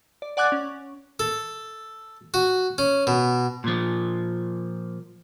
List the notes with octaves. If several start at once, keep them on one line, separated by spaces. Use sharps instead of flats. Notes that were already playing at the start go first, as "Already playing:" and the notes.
D5
D5 F#5 G#5 D6 F#6 A6
C#4
A4
F#4
C#4
B2
A#2 F3